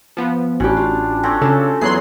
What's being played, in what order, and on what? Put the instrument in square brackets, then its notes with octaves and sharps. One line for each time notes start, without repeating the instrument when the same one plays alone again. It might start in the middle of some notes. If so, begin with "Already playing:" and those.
[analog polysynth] F3 B3
[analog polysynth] A1 [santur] G3 C#4 [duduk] D4 [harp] F#4 G4
[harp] F4
[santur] A3 C4 C#4
[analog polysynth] C#3 [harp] A4
[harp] E2 [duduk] F#3 [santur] G#4 [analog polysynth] C6 F#6 C7